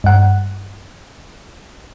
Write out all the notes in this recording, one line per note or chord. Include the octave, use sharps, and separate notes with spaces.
G2 F#5